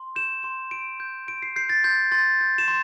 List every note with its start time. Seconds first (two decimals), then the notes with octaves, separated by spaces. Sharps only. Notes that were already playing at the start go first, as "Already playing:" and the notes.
Already playing: C6
0.16 G6 E7
0.43 C6 E7
0.71 C6 D7
1.00 G6
1.27 C6 D7
1.42 C7
1.56 G6 C7
1.69 A6
1.84 C6 G6
2.12 C6 A6
2.41 G6
2.58 E7
2.68 C6